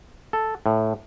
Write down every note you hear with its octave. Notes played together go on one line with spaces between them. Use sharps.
A4
A2